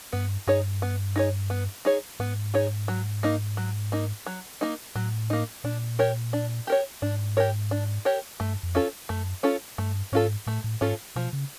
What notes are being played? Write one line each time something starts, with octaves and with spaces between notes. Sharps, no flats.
G2 B3
G2 D#4 G#4 C#5
B3
D#4 G#4 C#5
B3
D#4 G#4 C#5
G#2 B3
D#4 G#4 C#5
F#3
A#3 D#4
F#3
A#3 D#4
F#3
A#3 D#4
A2 F#3
A#3 D#4
A#2 D4
G4 A#4 C#5
D4
G4 A#4 C#5
G#2 D4
G4 A#4 C#5
D4
G4 A#4 C#5
G2 A3
F2
C#4 F4 A4
F#2 A3
C#4 F4 A4
G2 A3
G#2 C#4 F4 A4
A2 A3
A2
G#2 C#4 F4 A4
B2 F3
C#3